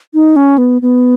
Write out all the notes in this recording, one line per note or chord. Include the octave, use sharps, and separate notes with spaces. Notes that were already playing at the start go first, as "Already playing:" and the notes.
D#4
C#4
B3
B3